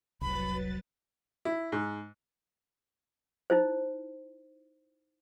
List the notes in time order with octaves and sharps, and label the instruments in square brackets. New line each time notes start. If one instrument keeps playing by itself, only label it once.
[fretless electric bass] F1 C2 [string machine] F#3 B4 A6 [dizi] B5
[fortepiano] E4
G#2
[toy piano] D#4 E4 C5